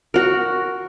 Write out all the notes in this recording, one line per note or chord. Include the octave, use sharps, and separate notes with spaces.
F#4 A#4